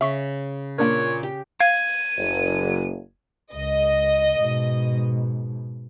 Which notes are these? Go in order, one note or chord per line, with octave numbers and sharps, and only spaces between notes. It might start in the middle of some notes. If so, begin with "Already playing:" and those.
C#3 E5 C#6 B6
A#2 A#3 D4 A#4 C#5
G4
F5 G#6 D#7
F#1
C#2 D#5
G#2 B2